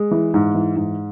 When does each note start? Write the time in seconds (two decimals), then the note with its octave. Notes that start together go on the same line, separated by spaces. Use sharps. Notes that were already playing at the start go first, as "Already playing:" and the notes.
Already playing: G#3
0.11 E3
0.34 G#2
0.55 E3
0.76 G#2